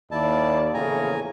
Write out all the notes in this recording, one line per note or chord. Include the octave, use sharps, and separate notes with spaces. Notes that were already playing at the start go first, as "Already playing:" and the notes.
D#2 E4 D5 A5
A#1 E2 A2 C#3 G#5 A#5